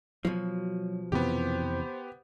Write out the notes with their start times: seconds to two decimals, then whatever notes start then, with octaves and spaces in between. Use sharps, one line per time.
0.25 B2 F3 F#3
1.12 F2 C3 E3 B3 G4 C5